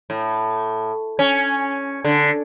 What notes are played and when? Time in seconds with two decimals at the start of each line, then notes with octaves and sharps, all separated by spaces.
0.10 A2
1.19 C#4
2.05 D3